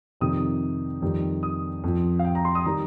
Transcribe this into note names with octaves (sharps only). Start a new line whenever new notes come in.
F2 C3 D#3 G3 D#6
F2 D#3 G3
D#6
F2 F3
F5
G5
A#5
C6
D#6
D#3 G3 A#5